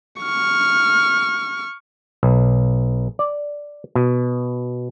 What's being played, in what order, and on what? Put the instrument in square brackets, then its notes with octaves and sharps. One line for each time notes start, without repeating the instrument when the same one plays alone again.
[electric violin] C#6 F6
[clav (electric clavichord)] B1
D5
B2